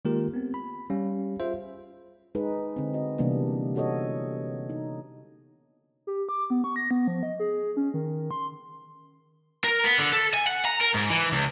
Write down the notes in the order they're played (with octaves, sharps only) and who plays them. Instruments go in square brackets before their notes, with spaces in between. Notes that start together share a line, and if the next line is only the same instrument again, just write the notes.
[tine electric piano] D#3 G#3 A#3 F4 G4 A#4
B3 C4
B5
G3 C#4 G4 F5
F4 G#4 C5 E5 F5
[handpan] G#3 D#4 G#4 B4
D3 C4
F#4 D#5
C3 E3 G3 A#3 B3 D4
C#4 F#4 A4 C#5 D#5
D#4
[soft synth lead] G4
D6
B3
C#6
A#6
B3
F3
D#5
G#4
C#4
D#3
C6
[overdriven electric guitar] A#4
B3
D3
A4
G#5
F#5
A#5
A#4
G#2
E3
C#2